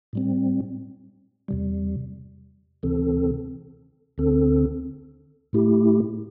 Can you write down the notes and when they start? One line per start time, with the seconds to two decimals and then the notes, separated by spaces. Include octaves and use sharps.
0.13 A2 G3 C4
1.48 E2 C3 G3
2.83 D2 C3 E3 C4 A4
4.18 D2 D3 C4 A4
5.53 A2 A3 E4 G4